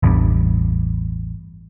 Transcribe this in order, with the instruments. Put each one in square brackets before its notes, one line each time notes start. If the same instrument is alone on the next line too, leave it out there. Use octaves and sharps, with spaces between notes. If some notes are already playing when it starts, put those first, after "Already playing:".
[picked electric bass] A1 E2 G2